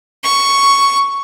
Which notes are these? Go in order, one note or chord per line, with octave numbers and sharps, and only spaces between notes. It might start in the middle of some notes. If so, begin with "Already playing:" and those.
C#6